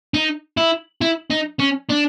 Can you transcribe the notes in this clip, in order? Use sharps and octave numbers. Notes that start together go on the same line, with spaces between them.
D#4
E4
E4
D#4
C#4
D4